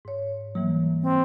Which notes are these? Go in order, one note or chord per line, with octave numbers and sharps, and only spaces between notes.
G#2 C#5
E3 F#3 G3 A#3
C4